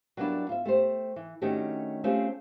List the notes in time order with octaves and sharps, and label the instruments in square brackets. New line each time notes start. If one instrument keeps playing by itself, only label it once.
[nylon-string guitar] F#3 G3 A#3 B3 D4 E4
F4 E5
A3 G4 C5
E3
D#3 A3 C#4 D4 F#4 G4
A3 C4 C#4 F4 G4 G#4